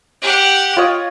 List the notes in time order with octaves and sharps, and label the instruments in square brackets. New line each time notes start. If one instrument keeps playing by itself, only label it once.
[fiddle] G4 F#5
[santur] F4 C#5 D#5